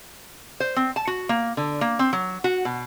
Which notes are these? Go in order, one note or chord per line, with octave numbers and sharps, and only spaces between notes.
C5
C4
A5
F#4
A#3
D3
A#3
C4
F#3
F#4
B2